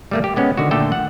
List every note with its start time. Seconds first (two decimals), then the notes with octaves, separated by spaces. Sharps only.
0.11 G3 A3 A#3
0.24 G4
0.36 G#3 B3 C#4
0.57 D3 D#3 F#4
0.71 A#2 D3 A3 A4 G5
0.92 F#5